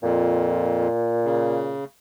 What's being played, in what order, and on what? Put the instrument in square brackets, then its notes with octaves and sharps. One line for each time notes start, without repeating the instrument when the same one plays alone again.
[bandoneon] F2 [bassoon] A#2
[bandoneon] C#3